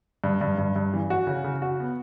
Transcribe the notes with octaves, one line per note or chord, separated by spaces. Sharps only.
G2
G2
G2
G2
E3
F#4
C#3
C#3
F#4
B3